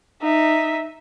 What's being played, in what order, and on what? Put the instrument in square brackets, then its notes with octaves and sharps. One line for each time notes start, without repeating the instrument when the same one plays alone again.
[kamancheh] D#4 E5